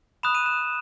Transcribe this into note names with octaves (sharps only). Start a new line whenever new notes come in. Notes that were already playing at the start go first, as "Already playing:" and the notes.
B5 D#6 F#6 E7
D#7
E7